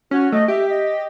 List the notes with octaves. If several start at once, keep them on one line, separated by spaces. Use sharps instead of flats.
C#4 F#4
A3 D#5
G4 E5
D#5